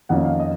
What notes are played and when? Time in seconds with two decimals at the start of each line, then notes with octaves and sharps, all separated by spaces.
0.09 F2 D#3 A#3 C#4 F#5
0.25 F5
0.40 D#5